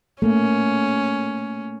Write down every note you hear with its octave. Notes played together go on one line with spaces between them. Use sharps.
A3 A#3 C#4